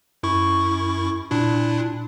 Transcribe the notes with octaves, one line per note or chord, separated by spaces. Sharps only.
F#2 E4 C#6
A#2 D4 E4